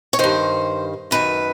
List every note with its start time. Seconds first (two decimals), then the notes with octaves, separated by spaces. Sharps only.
0.13 C#5
0.19 G2 D#3 C5
1.11 F#2 D#3 B4